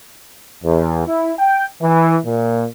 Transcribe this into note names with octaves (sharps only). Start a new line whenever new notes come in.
E2
E4
G5
E3
A#2